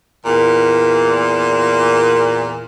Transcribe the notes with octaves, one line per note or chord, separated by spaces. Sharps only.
E2 A#2